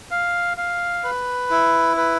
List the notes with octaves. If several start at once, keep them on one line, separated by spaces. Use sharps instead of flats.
F5
F5
B4
E4
B4